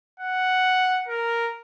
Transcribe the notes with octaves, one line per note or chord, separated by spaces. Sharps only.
F#5
A#4